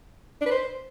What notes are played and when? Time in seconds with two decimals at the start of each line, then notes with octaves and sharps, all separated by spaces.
0.41 D4
0.46 B4
0.51 C5